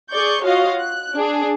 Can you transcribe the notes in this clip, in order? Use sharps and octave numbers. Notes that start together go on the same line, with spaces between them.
G#4 D5 C#6 G6
F4 F#4 C#5 D#5 F5
F#6
D4 G#4